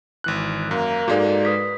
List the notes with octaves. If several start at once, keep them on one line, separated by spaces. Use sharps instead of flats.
G#1 E3 F#6
F#2 A#3
G#2 G#3 D#4 F#4 A4 D5
B4 D#6 B6